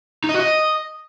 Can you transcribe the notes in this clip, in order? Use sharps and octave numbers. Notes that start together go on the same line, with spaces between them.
D#4
D#5
F#4
D#5